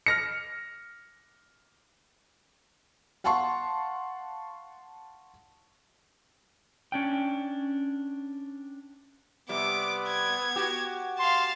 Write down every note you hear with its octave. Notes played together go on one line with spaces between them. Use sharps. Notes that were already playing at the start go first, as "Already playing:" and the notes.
F6 A#6 C#7
F5 F#5 A5 C6 C#6
C#4 D4 G5
C3 G3 B3 D6
G#6
F#4 G4
F5 A5 C6